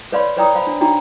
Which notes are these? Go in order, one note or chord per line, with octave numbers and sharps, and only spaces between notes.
B4 C#5 D5 F5 B5 C6
B4 C#5 D5 G5 A#5 D#6
C5 F5 B5
D4
D4 D#4 F#4 G5 A#5